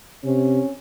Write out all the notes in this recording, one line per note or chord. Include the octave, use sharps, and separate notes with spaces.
C3 C#4